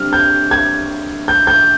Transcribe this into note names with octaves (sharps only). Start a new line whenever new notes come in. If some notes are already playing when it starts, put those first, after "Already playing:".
Already playing: D3 G3 C4 F6
G6
G#6
G6
G6